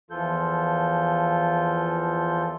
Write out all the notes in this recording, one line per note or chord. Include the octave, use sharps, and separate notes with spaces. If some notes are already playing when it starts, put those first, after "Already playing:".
E2 E3 F3 F4 A4 G6